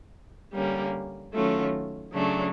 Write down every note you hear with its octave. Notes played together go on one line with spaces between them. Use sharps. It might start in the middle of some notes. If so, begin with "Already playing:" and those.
D3 G3 A#3 C#4
D#3 F#3 A3 C#4 F4
C#3 F#3 A3 D4